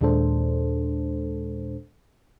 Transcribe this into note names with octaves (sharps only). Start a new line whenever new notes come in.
D#2 A#2 G#3 D4 A4 C5